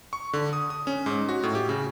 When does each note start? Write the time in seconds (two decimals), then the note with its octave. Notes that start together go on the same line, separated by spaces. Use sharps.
0.13 C#6
0.33 D3
0.53 D#6
0.70 D#6
0.87 C#4
1.06 G#2
1.29 F#4
1.43 A2
1.55 G4
1.69 C#3